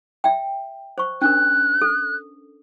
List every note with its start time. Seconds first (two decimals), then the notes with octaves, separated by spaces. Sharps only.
0.24 E5 G5
0.98 C5 C#6
1.22 C#4 D4 A#4 F#6
1.82 A4